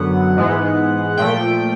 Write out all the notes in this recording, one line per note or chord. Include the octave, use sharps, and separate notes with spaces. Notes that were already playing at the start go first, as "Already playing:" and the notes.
Already playing: F#2 D3 F#3 B3 F#5
G#2 E3 G#3 B3
A#2 F3 A3 G5